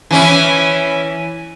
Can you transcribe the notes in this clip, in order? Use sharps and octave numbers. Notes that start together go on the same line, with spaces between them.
E3 C#4 E4